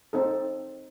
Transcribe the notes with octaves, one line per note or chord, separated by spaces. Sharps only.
C4 D#4 A4